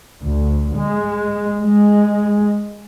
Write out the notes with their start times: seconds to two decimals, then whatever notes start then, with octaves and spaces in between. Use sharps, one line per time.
0.22 D2
0.76 G#3
1.60 G#3